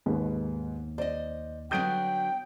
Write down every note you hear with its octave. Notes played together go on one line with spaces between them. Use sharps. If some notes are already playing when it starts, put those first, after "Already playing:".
D#2 G#2 B3
C5 D5 D#5
D3 F#3 B3 G5 D#6 G6 D7